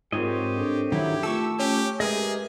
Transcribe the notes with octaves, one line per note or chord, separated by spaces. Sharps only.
G#2 C4 F4 G4 A#4 C#5 D#5
D4 A4
D#3 F#3 E4 G4
A3 F4 A4 C#6 E6
C#4 G4
G#3 G4 G#4 A#4 B4 D#5 E5